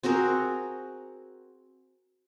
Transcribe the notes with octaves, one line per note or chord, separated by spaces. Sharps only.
C4 F#4 G#4 A#4